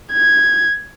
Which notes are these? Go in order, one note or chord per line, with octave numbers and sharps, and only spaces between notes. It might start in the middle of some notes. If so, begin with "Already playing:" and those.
G#6